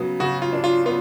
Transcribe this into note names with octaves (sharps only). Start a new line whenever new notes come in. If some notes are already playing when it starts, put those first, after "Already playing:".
Already playing: C#3 F#3 B3
C#3 F#4
F4
D4
F4
B3 F4